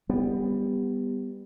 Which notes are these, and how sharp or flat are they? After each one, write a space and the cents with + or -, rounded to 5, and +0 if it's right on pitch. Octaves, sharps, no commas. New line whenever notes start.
G3 +15 B3 +0